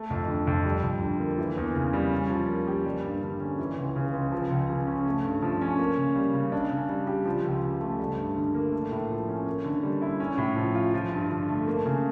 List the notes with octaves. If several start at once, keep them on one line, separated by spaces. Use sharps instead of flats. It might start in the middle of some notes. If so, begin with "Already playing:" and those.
Already playing: A3
F2
D3
F2
G3
F2
D3
A#3
E3
E2
C#3
G3
C#4
F3
A#3
G4
G3
G2
D3
C#4
E3
C#2
C#3
C#2
F3
C#2
C#3
C#4
A3
G2
F3
C#4
A#3
C#3
G3
C#3
D4
C#3
G3
G4
F3
C#2
C#3
A3
G3
G2
D3
A#3
A3
A2
F3
C#4
A#3
D3
G3
E4
C#4
A2
F3
F4
F3
G2
D3
A3
A#3
C#3